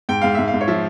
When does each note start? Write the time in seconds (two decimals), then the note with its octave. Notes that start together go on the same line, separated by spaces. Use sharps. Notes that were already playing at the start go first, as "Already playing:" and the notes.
0.09 G#2 G5
0.21 G#2 F5
0.35 G#2 E5
0.48 F5
0.54 G#2
0.61 C#5
0.68 F3 E5